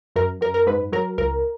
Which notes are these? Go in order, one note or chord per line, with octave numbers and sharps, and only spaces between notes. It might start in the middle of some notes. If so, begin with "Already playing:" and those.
F#2 A#4
F#2 A#4
A#4
G#2 B4
F#3 A#4
C#2 A#4